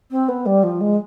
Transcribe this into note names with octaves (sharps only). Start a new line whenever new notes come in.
C4
B3
G3
F3
G#3